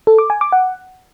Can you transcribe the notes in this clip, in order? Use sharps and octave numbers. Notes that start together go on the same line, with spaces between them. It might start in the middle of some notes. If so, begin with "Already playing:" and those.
A4
D6
G#5
D6
F#5